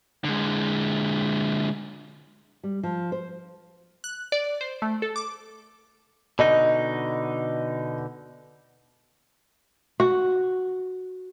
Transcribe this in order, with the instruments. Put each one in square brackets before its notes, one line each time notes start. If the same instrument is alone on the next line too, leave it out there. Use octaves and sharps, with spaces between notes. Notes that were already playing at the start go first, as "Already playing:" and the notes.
[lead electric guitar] D3 G#3
[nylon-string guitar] G3
F3
C5
[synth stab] F#6
D5
C5
A3
A4
D6
[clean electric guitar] B2 D3 D#4 [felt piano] D#5
[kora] F#4